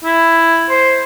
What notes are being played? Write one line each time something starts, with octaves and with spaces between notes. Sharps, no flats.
E4
C5